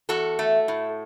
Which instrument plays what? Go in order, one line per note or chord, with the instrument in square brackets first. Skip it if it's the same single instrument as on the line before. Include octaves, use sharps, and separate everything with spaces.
[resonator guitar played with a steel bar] E2 F#4 A4
A3
A2